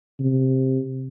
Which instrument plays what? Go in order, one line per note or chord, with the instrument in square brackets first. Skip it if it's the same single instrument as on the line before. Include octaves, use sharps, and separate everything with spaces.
[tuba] C3